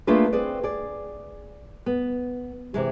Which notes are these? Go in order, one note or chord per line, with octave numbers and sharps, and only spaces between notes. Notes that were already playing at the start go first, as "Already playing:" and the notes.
A3 A#3 D4 F4 G#4 B4
C4 G#4 B4 D5
G#4 D5
B3
C3 E3 G#3